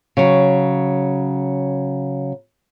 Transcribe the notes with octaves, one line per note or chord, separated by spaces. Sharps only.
C#3 F#3